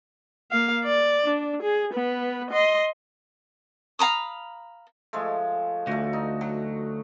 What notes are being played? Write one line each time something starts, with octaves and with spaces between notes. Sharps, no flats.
A#3 F5
D5
D4
G#4
B3 B4
D#5 C6
F5 A#5 B5 D#6
F3 G#3 A3
D2 A3 F#4
D#4
F#3